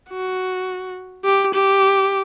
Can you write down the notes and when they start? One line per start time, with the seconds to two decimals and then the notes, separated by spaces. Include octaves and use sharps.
0.10 F#4
1.24 G4
1.54 G4